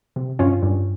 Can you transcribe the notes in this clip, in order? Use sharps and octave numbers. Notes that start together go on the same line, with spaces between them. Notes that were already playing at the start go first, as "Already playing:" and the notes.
C3
G2 C#4 F4
G2